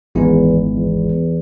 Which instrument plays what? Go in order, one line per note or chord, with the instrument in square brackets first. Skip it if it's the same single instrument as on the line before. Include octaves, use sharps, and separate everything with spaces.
[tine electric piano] G#1 G#2 G#3 B3 E4 [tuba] E2
[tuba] E2